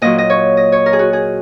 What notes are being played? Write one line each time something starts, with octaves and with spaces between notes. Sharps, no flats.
A#2 F#3 D#5
D#5
C#5
D#5
C#5
A#4
G#4
F#4
G#4